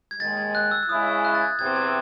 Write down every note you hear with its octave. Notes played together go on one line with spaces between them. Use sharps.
G#6
D#2 D#3 G#3 A6
G#6
F#6
E6
E6
C#3 G#3 C#4 E4 D#6
E6
F#6
A6
G#6
E2 C3 E3 C4 G#6
G#6